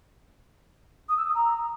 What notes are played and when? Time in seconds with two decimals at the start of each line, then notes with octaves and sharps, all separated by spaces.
1.09 D#6
1.17 E6
1.26 D#6
1.35 A#5